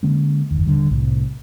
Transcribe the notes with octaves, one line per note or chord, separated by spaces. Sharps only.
D3 G#3 A#3 C#4
F#1 D#2
D#1 D#2 D3 G3
C2 A2